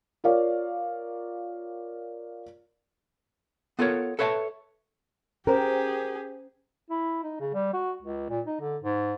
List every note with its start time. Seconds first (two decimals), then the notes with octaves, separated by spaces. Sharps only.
0.24 F4 A#4 C#5 D5 F5
3.79 B3 F4 A4 A#4 C#5
4.19 A4 B4 C#5 E5 F5 A5
5.47 C#4 G4 G#4 A#4 C5 A#5
6.90 E4
7.23 D#4
7.40 C#3
7.54 G3
7.74 F#4
8.02 C#2
8.30 A#2
8.46 D#4
8.61 D3
8.83 G#2